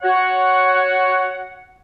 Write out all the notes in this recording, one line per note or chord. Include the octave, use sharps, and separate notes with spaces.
F#4 C#5 F#5